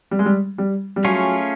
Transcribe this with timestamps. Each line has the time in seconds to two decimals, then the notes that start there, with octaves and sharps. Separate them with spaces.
0.11 G3
0.19 G#3
0.26 G3
0.58 G3
0.96 G3
1.04 F#3 A3 C#4 F4 G#4 C#5